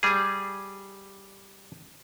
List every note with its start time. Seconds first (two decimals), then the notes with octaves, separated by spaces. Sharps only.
0.03 G3 G#4